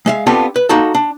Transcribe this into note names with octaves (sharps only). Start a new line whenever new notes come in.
G#3 E5 F5
B3 C4 D4 F4 G4 A4
B4
A#3 D#4 F#4 A4
D4